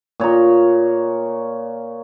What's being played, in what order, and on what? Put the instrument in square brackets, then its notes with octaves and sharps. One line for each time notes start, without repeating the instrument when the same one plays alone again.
[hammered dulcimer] A#2 C#5 D#5 A#5